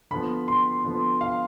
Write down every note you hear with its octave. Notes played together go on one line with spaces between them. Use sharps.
D3 F3 B3 B5
C6
D3 F3 B3
F5